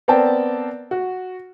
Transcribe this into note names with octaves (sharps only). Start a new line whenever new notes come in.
B3 C4 A#4 D5 G5 A5
F#4